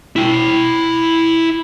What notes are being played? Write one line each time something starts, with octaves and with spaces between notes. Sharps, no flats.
E4 G5